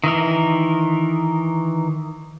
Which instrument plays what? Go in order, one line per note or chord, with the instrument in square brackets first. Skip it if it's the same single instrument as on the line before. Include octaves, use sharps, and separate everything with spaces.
[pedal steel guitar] D#3 E3 A#4